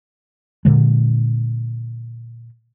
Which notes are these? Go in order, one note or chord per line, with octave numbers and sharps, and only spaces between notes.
A#2 D3 G#3